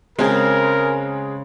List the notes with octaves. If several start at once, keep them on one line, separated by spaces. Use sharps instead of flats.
C#3 G#3 C4 G#4 A#4